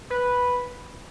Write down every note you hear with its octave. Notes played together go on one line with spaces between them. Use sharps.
B4